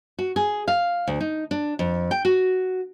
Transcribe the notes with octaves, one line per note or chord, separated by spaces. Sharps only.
F#4
G#4
F5
D2
D#4
D4
F2
G5
F#4